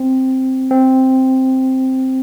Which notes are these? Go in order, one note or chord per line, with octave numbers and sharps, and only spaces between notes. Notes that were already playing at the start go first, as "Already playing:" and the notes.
Already playing: C4
C4